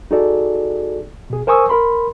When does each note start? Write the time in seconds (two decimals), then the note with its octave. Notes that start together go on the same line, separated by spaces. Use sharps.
0.11 D#4 F#4 G#4 A4 D5
1.30 B2 G#4
1.47 A#4 C5 G#5 C#6 D#6 E6
1.69 A#4 B5 C6